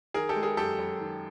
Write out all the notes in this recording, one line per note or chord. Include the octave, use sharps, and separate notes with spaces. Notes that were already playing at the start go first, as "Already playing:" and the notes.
D#3 G#4 A#4
G4 A4
G#3
G#4 A#4
F#2 G4 A4
F#2
D#3